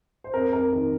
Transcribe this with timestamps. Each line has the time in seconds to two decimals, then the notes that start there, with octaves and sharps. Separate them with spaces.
0.24 C5
0.34 F2 A#4
0.53 F2 A#4
0.72 D#3 A#4